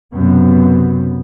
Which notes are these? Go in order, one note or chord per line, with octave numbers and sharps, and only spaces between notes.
B1 F#2 C3 B3